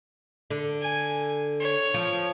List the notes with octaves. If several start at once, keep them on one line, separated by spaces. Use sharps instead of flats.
D3
G#5
C#5
F3